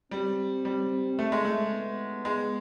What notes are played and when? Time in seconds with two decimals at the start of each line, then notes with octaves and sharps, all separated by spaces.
0.11 G3 C4
0.65 G3
1.19 A3
1.32 G#3
1.45 A3
1.72 B3
2.25 G#3